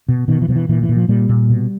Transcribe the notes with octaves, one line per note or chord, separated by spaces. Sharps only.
B2
B2 D#3
E3
B2 F3
E3
A#2 E3
E3
A#2
F3
A#2 G3
A#2
B2